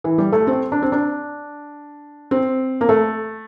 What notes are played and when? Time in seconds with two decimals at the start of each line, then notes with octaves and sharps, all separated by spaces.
0.04 E3
0.18 G3
0.32 A3
0.47 C4
0.72 D4
0.82 C4
0.92 D4
2.31 C4
2.81 A#3
2.89 A3